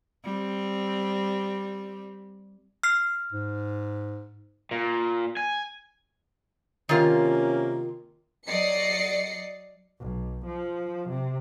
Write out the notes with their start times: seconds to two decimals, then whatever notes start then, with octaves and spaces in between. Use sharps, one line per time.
0.24 G3 C4
2.83 F6 C7
3.32 G#2
4.71 A#2
5.37 G#5
6.89 C3 D#3 A#3 C#4 F4
8.46 F#3 D5 D#5 C7 C#7
10.00 B1
10.46 F3
11.10 C3